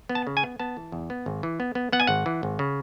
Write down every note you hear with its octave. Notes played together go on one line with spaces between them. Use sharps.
B3
A5
C#3
G#5
B3
B3 A5
E3
E2
B3
G#1
E3
B3
B3
B3 F#5
G#5
G#1 F#5
E3
G#1
C#3